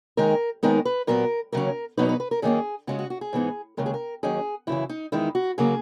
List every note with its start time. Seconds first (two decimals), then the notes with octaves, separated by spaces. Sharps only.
0.17 D#2 D#3 G#3 D#4 A#4
0.63 D#2 D#3 G#3 B3 D#4 A#4
0.85 B4
1.07 A#2 F#3 B3 A#4
1.52 D#2 C#3 F#3 C#4 A#4
1.97 E2 B2 F#3 B3 D#4 B4
2.09 B4
2.20 B4
2.31 A#4
2.42 F#2 D#3 A#3 C#4 G#4
2.87 C#3 G#3 C#4 F#4
2.99 F#4
3.10 F#4
3.21 G#4
3.33 G#2 E3 B3 D#4
3.77 D#2 C#3 G#3 A#4
3.86 G#4
3.94 A#4
4.23 D#2 D#3 F#3 C#4 G#4
4.67 F#2 C#3 E3 E4
4.89 D#4
5.12 E2 D#3 G#3 D#4 E4
5.35 F#4
5.58 C#3 F#3 A#3 G#4